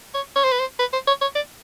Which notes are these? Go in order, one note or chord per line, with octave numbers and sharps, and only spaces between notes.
C#5
C#5
C5
B4
C5
B4
C5
C#5
C#5
D5